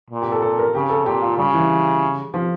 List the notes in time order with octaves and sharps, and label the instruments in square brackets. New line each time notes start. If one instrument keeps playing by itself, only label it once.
[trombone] A#2
[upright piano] G4
A4
A4
A#4
[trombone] C#3 [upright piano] G4
[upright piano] A4
[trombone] A#2 [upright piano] G4
[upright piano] F4
[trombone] C#3 [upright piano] G3
[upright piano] E3
F3